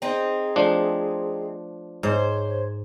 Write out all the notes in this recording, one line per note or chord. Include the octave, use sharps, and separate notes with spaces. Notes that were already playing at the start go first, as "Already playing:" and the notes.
C4 D#4 G#4
F3 A3 D4
G#2 C5 C#5